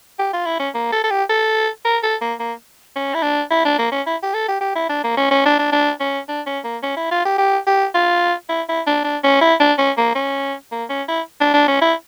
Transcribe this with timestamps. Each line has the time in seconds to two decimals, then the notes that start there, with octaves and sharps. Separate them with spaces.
0.19 G4
0.33 F4
0.45 E4
0.59 C#4
0.74 A#3
0.92 A4
1.04 A4
1.11 G4
1.29 A4
1.85 A#4
2.03 A4
2.21 A#3
2.39 A#3
2.96 C#4
3.14 E4
3.22 D4
3.51 E4
3.65 D4
3.78 A#3
3.92 C#4
4.06 E4
4.23 G4
4.34 A4
4.48 G4
4.61 G4
4.75 E4
4.89 D4
5.04 A#3
5.17 C#4
5.31 C#4
5.45 D4
5.59 D4
5.72 D4
6.00 C#4
6.28 D4
6.46 C#4
6.64 A#3
6.83 C#4
6.97 E4
7.11 F4
7.25 G4
7.38 G4
7.67 G4
7.94 F4
8.49 E4
8.68 E4
8.87 D4
9.04 D4
9.24 C#4
9.41 E4
9.60 D4
9.78 C#4
9.97 A#3
10.15 C#4
10.71 A#3
10.89 C#4
11.08 E4
11.41 D4
11.53 D4
11.68 C#4
11.81 E4